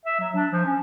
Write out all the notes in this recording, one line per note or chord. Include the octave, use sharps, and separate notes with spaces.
E5
F#3
D4
F3
C#4